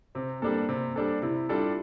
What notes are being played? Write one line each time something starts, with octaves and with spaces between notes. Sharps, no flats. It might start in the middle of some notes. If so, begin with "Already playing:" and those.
C3 C4
G3 A#3 D4 A4
C3 C4
G3 D4 A4
C3 E4
G3 D4 F4 A4